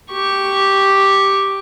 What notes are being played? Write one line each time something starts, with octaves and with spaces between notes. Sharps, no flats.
G4 C#6